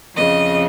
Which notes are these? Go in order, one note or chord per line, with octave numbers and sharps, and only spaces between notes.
F2 C#3 D#5